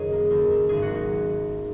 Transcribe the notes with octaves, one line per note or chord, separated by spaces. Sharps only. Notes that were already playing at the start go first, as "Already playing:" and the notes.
Already playing: F#1 F#2 D#3 G#4 C#5 D#5
A#3
D#2
D#2
G#1 G#4
F#4
F#3
D#4